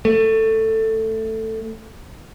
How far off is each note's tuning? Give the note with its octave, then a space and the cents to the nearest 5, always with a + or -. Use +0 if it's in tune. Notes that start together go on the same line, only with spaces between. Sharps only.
A3 +10